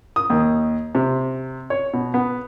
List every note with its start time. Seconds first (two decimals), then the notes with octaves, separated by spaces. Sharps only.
0.16 D#6
0.30 D#2
0.95 C3
1.70 C#5
1.93 B2
2.14 B3